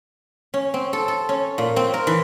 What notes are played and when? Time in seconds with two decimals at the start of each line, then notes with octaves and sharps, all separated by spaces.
0.54 C#4
0.74 C4
0.93 A4
1.08 A4
1.29 C#4
1.58 A#2
1.76 C4
1.94 A#4
2.07 E3